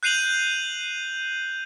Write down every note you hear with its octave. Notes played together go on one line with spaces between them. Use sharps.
F#6 G6 C7 D#7 F7 F#7